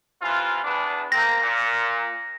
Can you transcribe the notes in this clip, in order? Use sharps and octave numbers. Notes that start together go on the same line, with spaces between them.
C3 E3 F4
E2 B3 D4
A#3 C4 A#6
A#2